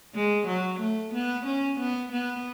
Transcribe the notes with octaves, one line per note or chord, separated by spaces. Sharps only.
G#3
F#3
A3
B3
C#4
B3
B3